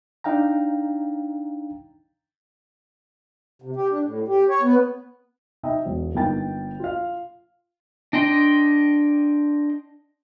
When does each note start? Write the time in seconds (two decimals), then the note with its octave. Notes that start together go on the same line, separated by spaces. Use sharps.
0.24 D4 D#4 F5 G5 A#5
3.62 C3
3.76 G4
3.90 D4
4.03 A2
4.28 G4
4.49 C#5
4.62 B3
5.63 D#4 D#5 E5 G5
5.86 E1
6.14 G1 A#3 D#4 G5 A6
6.79 F4 F5
8.13 D4 D#5 G5 C6